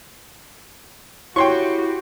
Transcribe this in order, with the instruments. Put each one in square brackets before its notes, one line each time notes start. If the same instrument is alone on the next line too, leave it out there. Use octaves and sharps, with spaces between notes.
[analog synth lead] E4 [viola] F#4 G4 [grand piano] C#5 [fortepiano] G5 C6 C#6